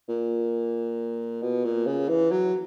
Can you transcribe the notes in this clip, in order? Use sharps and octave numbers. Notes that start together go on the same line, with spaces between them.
A#2
B2
A#2
C#3
E3
F#3